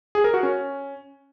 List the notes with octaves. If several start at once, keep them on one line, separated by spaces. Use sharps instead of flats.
G#4
A#4
F#4
C#4